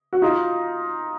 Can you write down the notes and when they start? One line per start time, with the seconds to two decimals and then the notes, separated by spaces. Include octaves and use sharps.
0.13 F#4
0.22 D#4 F4